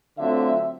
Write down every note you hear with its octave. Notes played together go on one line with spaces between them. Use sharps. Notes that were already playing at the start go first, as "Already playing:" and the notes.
D3 F#3 A3 C4 F4 E5